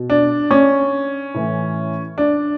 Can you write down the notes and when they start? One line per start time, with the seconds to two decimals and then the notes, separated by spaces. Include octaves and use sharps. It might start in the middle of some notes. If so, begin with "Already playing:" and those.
Already playing: B2
0.10 D4
0.51 C#4
1.34 A2 E3
2.18 D4